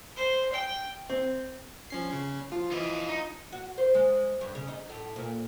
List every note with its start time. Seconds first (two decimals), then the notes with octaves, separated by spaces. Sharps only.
0.16 C5
0.52 G5
1.10 C4
1.90 F3 C#4 C7
2.10 C#3 C#4
2.52 F3 F4
2.71 E3 F4 D#5
3.09 D#4
3.52 F#4
3.78 C5
3.95 G#3
4.41 G2
4.55 C#3
4.68 D#4
4.89 A2
5.16 A#2